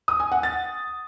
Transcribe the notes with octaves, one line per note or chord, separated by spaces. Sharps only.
D#6
G#5
F#5
A6